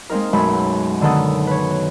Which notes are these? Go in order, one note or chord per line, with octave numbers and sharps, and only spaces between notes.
G#3 A#3 C4 D#4 A#4
B1 F#2 G#3 A3 B5
D3 D#3 B3 A4 F#5 D#6
B4 C#5